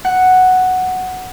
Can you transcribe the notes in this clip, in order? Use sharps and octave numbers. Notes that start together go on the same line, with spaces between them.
F#5